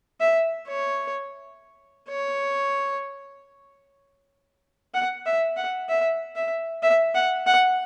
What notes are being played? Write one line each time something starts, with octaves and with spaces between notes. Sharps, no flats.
E5
C#5
C#5
F#5
E5
F#5
E5
E5
E5
F#5
F#5